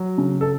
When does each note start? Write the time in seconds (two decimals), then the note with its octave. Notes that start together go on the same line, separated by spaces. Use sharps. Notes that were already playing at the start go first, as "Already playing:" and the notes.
Already playing: F#3
0.18 C#3
0.41 A4